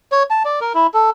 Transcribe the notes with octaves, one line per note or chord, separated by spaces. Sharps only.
C#5
A5
D5
A#4
E4
A4